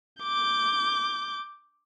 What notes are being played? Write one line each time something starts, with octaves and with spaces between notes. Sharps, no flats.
D6 G6